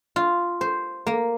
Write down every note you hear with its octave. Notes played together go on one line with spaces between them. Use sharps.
F4
C5
A#3